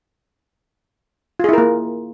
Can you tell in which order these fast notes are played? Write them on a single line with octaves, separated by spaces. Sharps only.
F4 G#4 E4 A#4 A#3